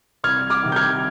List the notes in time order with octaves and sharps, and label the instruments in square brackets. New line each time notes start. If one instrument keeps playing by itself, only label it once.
[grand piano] C2 F6 G#6
D6 F6
C3 D#3
G6
F6 G#6